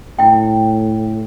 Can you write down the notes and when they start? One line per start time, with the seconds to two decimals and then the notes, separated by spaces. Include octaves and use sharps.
0.19 A2 E4 G5